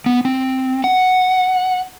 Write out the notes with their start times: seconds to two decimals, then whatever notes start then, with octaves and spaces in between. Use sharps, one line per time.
0.06 B3
0.25 C4
0.84 F#5